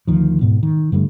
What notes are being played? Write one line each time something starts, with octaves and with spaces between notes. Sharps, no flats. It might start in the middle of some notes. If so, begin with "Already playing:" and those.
D2 D#3 F3
G#2 B2
D#3
G2 D3 G3 A3